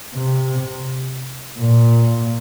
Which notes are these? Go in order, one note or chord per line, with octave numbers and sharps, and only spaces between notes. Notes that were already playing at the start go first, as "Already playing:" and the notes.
C3
A#2